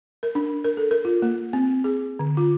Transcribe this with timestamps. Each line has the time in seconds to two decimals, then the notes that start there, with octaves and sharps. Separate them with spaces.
0.23 A#4
0.35 D4
0.64 A#4
0.77 A4
0.91 A#4
1.05 F4
1.22 A#3
1.53 C4
1.84 G#4
2.19 D3
2.37 F4